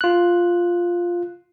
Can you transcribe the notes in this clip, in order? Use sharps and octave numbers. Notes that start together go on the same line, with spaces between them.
F4 F#6